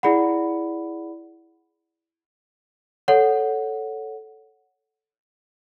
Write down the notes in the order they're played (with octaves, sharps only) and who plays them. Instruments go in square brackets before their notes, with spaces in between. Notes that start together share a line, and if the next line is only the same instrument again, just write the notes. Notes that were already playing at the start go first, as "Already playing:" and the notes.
[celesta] E4 G#4 D5 F#5 B5
A4 C#5 F#5